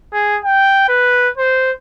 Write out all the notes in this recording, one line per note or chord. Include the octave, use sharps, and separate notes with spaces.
G#4
G5
B4
C5